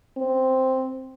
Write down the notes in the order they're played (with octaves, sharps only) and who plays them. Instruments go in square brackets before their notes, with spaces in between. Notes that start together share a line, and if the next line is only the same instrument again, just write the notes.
[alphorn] C4